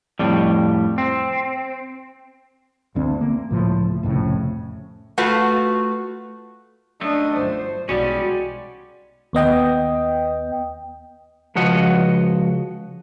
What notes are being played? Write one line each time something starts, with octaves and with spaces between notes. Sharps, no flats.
F2 A2 G3
C4
G1 D2 C4
A#3
C#2 A2 F3
C2 F2 A2 C#3
A3 F4 F#4 B4
F#2 A3 D4 D#5
G1 F#3 C5
B1 E3 G3 G#3 C#4 F#4 D5
D#2 B3 D#5 G5
C#2 F3 F#4 D#5 F#5